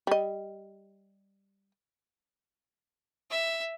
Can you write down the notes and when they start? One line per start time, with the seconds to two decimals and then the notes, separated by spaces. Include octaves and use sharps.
0.07 G3 D#5
3.31 E5